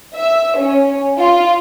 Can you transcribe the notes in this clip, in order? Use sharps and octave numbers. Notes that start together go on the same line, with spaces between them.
E5
C#4
F4